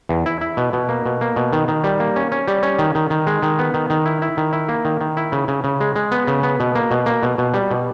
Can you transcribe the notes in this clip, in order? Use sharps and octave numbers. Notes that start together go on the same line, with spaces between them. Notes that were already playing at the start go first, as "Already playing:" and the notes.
E2
E4
E4
B2
B2
A#3
B2
A#3
B2
D#3
D#3
G3
A#3
C#4
C#4
G3
C#4
D#3
D#3
D#3
G#3
D#3
B3
D#3
D#3
E4
E4
D#3
E4
A#3
D#3
D#3
E4
C#3
C#3
C#3
G#3
G#3
B3
C#3
B3
B2
A#3
B2
A#3
B2
B2
G3
B2